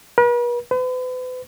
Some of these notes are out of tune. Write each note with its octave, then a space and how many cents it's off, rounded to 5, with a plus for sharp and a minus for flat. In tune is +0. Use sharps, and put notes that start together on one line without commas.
B4 -45
B4 +40